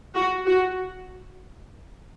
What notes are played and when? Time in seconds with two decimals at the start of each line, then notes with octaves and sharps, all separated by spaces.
0.15 F#4
0.46 F#4